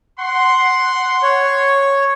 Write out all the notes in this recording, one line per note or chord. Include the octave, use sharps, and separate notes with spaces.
F#5 C6
C#5